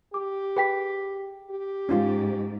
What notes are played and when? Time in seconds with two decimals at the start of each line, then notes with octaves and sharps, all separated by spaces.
0.14 G4 D6
0.57 G#4 B4 G5 B6
1.51 G4
1.89 G#2 C#4 D#4 F4